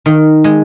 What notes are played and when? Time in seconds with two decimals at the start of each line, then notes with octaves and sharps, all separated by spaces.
0.06 D#3
0.44 G#3